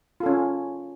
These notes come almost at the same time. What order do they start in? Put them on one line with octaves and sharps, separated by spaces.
F4 A4 C#4